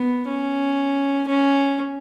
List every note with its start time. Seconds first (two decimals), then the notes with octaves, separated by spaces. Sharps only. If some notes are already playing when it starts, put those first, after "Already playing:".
Already playing: B3
0.28 C#4
1.28 C#4